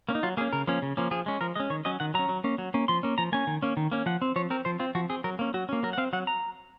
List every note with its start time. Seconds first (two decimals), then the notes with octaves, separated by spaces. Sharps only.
0.09 A#3 C#4
0.15 D#4
0.23 F#3 F4
0.37 A#3 G#4
0.41 C#4
0.53 C#3 A#4
0.67 F3 A#3 C#4
0.82 C#3
0.97 F3 A#3 C#4
1.11 F3 G#4
1.26 G#3 C#4
1.41 F3 A#4
1.55 G#3 C#4 D#5
1.70 D#3 C#5
1.85 F#3 C#4 D#5
2.00 D#3 F#5
2.14 F#3 C#4 A#5
2.29 F#3
2.44 A#3 C#4
2.58 F#3
2.74 A#3 C#4
2.88 F3 C6
3.03 A#3 C#4
3.18 F3 A#5
3.32 A#3 C#4 G#5
3.47 D#3
3.62 A#3 C#4
3.77 D#3
3.92 A#3 C#4
4.06 F3 F#5
4.22 C4
4.36 F3 C#5
4.50 C4 A#4
4.65 F3 C5
4.79 C4 F4
4.95 F3 F#4
5.10 C4 G#4
5.24 F#3 A#4
5.39 A#3 C#4
5.54 F#3 F#4
5.69 A#3 C#4
5.83 F#3 A#4
5.93 F#5
5.98 C4 F5
6.13 F#3 F#5
6.27 A#5